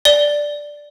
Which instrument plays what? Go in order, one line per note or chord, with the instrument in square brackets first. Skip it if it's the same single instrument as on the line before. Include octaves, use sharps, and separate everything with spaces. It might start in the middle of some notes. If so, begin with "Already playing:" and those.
[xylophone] D5 G7